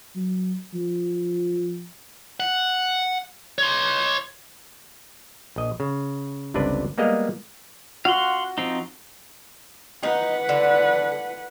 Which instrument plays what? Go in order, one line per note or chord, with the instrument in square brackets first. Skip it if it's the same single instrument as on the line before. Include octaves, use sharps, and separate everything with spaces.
[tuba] F#3
F3
[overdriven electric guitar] F#5
C#5 C6
[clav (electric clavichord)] A#1 D#5
C#3
G1 C#2 C3 D4 B4 D5
G3 G#3 A#3 B3 D#5 F5
[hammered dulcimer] F#4 [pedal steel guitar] F5 F#5 C6
[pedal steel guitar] F3 C4 D#4
[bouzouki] D#4 [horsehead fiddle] B4 F#5
[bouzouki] D3